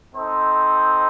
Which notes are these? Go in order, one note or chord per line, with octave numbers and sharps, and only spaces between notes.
C4 D#4 A4 C5